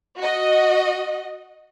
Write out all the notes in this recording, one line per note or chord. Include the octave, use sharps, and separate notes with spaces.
F#4 D#5